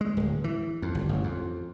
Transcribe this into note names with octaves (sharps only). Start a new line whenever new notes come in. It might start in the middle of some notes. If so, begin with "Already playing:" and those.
G#3
D1
E3
F2
G1
A1
F2